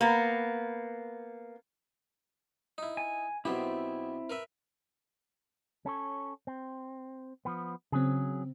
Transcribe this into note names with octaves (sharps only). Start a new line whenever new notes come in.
A#3 B3
D#4 E4
G#5
B1 B3 C4 E4 G4
A#4 B4 E5
C#4 A4 C#5
C4
F3 B3
C#3 F#3 C4 G#4